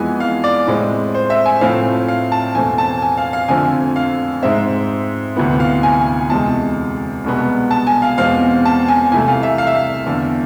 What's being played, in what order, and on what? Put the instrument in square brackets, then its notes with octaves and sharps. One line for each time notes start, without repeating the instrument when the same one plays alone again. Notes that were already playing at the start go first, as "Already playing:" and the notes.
Already playing: [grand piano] F2 E3 G#3 B3 G#5
F5
D5
A2 G#3 C4
C5
E5
G#5
A2 F3 A3 C4 F5
F5
A5
E2 B2 A3 C4 G#5
A5
G#5
F5
F5
F2 D3 A3 C4 G#5
F5
G#2 G#3 C4 E5
D2 C3 E3 B3
F5
G#5
E2 C3 G#3 A5
C2 B2 G#3 B3
A5
G#5
F5
E2 B2 G#3 C4 F5
A5
G#5
C2 C3 E3 A3 G#5
F5
E5
F5
E5
F5
E2 D3 A3